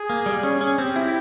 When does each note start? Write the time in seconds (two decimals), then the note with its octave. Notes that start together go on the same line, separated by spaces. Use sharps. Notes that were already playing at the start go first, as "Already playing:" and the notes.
Already playing: G#4
0.10 A#3
0.26 G3
0.43 C#4
0.61 C#4
0.78 C4 G4
0.96 E4